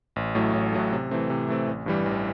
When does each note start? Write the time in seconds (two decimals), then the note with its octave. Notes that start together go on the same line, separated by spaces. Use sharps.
0.16 A1
0.35 A2 F#3 A3
0.53 A1
0.72 A2 F#3 A3
0.92 C3
1.11 E3 A3 C4
1.30 C3
1.48 E3 A3 C4
1.67 A1
1.86 G2 E3 G3
2.06 A1